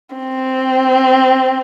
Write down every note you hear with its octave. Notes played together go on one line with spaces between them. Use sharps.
C4